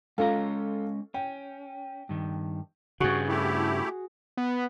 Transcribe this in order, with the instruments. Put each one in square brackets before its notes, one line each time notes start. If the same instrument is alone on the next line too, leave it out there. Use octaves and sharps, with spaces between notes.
[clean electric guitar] G#3 C#4 A#5 [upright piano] F4 A4
[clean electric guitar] C#4 [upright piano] G5
[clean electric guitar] G2 D#3
[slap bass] G2 C#3 [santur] F#4 G#4
[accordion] A3 E4 G4
[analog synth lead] B3